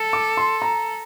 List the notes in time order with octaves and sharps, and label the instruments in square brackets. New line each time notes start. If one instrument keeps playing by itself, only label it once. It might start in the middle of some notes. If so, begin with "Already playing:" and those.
Already playing: [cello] A4
[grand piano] D6
C6
A#5